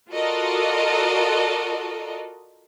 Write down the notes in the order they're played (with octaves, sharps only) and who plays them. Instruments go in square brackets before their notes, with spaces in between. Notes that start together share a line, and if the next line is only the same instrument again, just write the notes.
[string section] F4 F#4 A4 A#4 D5 D#5